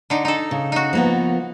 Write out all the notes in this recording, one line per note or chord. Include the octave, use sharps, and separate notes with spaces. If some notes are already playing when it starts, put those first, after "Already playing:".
D3 D#4
D#4 A4
C#3
D#4 F#4
F3 A#3 B3